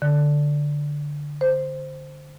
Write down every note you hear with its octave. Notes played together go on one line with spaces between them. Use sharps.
D3
C5